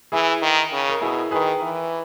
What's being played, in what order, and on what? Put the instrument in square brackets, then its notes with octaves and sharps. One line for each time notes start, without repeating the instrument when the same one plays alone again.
[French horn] E3 [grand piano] E4 G#4
[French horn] D#3
C#3
[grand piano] A#4
[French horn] B2 [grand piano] E4 G#4
[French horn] D#3 [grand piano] G#4 B4
[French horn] E3